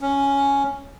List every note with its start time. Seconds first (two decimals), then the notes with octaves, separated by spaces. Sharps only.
0.01 C#4